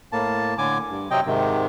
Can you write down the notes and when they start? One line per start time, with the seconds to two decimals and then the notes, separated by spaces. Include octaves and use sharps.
0.12 A2 A#3 A5
0.58 A2 D3 G#5 D6
0.90 G2
1.11 C3 F#3 C4 D#5 G5
1.26 G#2 C3 D#3